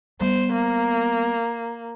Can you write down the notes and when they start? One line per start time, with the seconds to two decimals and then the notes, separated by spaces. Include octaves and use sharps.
0.20 G3 B3 C5
0.53 A#3